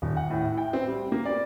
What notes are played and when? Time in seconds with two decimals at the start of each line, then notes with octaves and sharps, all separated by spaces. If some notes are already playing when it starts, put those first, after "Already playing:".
0.02 D#1
0.17 F#5
0.30 A2
0.45 E4
0.57 G5
0.73 C4
0.87 G3
1.12 A#3
1.25 D5